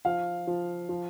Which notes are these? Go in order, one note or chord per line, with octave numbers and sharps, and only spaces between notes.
F3 F5
F3
F3